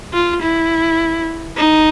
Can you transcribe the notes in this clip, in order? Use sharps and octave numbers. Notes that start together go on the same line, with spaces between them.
F4
E4
D#4